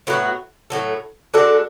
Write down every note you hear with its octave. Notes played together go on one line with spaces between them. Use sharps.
A2 F#3 B3 F#4
A2 F#3 A3
G#3 D4 F#4 A4